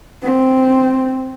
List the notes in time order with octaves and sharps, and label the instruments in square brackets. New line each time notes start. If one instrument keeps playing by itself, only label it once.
[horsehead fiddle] C4